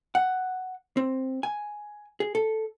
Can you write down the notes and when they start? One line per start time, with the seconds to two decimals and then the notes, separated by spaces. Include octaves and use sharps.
0.15 F#5
0.97 C4
1.43 G#5
2.20 G#4
2.35 A4